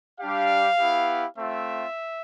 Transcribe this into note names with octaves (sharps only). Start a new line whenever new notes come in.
G3 D4 G4 F5
B3 E4 G4
A3 C4 F4 E5